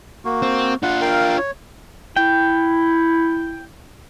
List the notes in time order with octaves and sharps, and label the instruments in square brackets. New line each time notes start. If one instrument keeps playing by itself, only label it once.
[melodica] A#3 F#4
[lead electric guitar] C4
[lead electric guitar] D4 F4 [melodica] F#5
[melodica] A#4 F5 G5
C#5
[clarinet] E4 [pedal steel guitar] G5